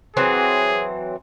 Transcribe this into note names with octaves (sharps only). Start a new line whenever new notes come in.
E3 F#3 C4 G#4